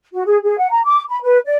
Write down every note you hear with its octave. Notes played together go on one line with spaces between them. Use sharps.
F#4
G#4
G#4
F#5
A#5
D6
B5
B4
D5